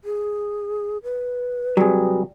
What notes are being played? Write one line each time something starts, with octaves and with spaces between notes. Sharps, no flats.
G#4
B4
C3 F#3 G3 G#4